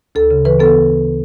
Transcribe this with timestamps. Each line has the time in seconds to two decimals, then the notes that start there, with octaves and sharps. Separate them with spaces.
0.15 D2 A4
0.31 C#3
0.45 E3 B4
0.59 B3 A4